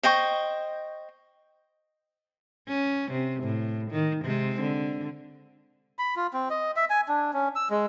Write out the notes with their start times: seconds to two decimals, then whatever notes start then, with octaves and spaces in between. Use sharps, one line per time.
0.03 C5 D#5 G5 C#6
2.68 C#4
3.11 C3
3.43 A2
3.91 D#3
4.25 C3 G#3 C4
4.61 D3
5.99 B5
6.16 F4
6.33 C4
6.50 D#5
6.76 E5
6.90 G#5
7.08 D4
7.33 C#4
7.56 E6
7.70 G#3